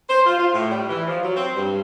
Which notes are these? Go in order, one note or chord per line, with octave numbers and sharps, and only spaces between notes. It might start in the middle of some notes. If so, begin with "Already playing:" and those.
C5
F4
F4
A2
G3
E3
F3
F#3
C4
G2